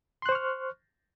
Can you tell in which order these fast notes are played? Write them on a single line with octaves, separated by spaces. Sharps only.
C6 F#6 C5 C#6 F6